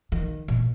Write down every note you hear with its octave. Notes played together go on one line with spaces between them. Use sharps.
D#3
A#2